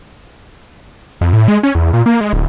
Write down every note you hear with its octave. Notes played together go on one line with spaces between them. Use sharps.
F2
A2
G#3
C#4
E2
A#2
A#3
G#3
D1